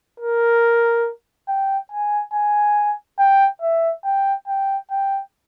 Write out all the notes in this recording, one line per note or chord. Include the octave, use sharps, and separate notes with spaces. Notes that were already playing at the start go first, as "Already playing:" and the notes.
A#4
G5
G#5
G#5
G5
E5
G5
G5
G5